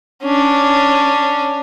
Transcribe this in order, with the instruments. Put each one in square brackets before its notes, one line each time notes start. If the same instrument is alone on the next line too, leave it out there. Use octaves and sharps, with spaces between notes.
[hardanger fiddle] C#4 D4